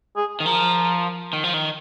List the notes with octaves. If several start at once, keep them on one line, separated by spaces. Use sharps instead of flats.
G#4
D#3
F3 A#4
D#3
F3
D#3